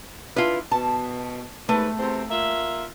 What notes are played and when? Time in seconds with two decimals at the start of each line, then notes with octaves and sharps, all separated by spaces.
0.36 D4 E4 F4 B4
0.71 B2 A5
1.69 D#2 G#2 A3 B4
1.98 E2 C3 C4
2.30 A#3 F4 E5